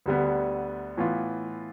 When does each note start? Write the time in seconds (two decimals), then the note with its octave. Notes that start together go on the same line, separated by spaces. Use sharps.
0.06 D2 D3 G3 B3
0.97 A2 E3 B3 F4